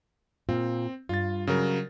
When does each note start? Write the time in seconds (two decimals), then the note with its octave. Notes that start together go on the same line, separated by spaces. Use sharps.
0.49 A#2 C4 F4 F5
1.09 G2 F4 A6
1.47 C#3 F#3 A#4